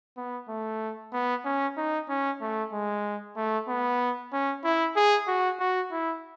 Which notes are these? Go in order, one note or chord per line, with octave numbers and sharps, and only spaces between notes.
B3
A3
B3
C#4
D#4
C#4
A3
G#3
A3
B3
C#4
E4
G#4
F#4
F#4
E4